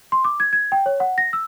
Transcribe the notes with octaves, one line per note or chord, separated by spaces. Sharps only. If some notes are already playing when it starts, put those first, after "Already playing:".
C6
D6
G#6
G#6
G5
C#5
F#5
A#6
E6